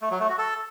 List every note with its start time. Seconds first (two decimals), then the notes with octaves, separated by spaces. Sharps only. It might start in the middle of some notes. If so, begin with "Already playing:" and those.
0.02 A3
0.11 F#3
0.20 A3
0.29 F#4
0.38 A4